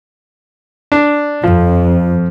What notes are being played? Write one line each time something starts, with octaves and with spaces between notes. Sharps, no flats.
D4
F2 F3